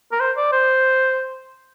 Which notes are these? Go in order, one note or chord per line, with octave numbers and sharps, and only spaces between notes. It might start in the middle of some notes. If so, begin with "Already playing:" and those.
A#4
C5
D5
C5